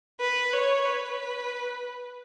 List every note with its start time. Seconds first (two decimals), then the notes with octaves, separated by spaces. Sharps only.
0.20 B4
0.53 C#5
0.86 B4